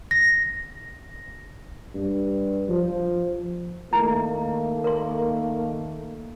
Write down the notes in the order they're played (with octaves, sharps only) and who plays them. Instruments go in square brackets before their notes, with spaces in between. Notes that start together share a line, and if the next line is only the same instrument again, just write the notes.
[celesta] A#6
[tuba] G2
F3
[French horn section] D#3 A3 A#3 [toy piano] E4 A#5
[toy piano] A#4 C6